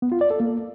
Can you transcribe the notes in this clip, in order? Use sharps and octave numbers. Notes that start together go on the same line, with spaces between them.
B3
F4
D5
A4
A#3